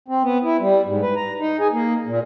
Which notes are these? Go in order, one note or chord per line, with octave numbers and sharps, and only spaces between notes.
C4
B3
E4
G3
G#2
B4
A#5
D#4
G#4
A#3
A#2